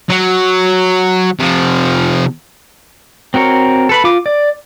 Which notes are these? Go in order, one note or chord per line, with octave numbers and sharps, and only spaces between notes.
F#3
C3 F3
C4 F#4 A#4 C#5
A4 B4 B5
F4 D6
D5